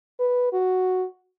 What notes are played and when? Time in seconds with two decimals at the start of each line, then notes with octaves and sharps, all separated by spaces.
0.20 B4
0.53 F#4